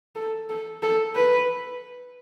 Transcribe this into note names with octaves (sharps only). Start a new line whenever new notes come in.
A4
A4
A4
B4